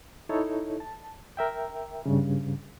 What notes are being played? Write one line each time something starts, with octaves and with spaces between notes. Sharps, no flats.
D#4 E4 A4 C#5
A5
A#4 E5 G5
G2 C#3